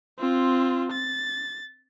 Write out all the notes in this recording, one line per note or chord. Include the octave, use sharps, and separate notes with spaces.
C4 F4
A6